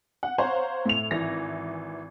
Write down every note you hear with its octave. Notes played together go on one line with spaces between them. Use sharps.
F#5
C5 C#5 F5 F#5 A#5 C6
A2 F7
G#1 E3 A#6